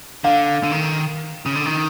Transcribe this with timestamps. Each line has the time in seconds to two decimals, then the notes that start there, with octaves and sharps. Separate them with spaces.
0.24 D3 F5
0.63 D3
0.72 D#3
1.46 C#3
1.55 D3
1.66 D#3